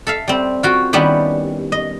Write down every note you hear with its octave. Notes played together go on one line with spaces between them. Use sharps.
A4 E5 F5
G3 C4
F4 F#4 G5
D#3 G3 B3 C#4 E4 G4
D#5